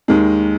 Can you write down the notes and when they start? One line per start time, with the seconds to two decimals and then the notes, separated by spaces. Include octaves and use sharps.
0.08 D#2 D#3 G#3